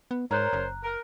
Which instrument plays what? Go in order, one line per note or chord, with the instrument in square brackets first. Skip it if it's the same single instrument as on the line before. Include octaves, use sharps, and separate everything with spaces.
[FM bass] B3
[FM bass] G#2 [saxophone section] A#4 C5 C#5 [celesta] A#5 F#6
[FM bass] F#1
[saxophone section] A#4